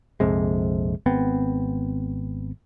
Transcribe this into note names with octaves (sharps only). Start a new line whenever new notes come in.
A#1 F2 C3 G#3
G#1 B3 C4